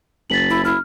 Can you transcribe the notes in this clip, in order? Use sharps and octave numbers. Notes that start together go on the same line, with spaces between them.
F#1 A6 B6 F#7
E4
E4 F6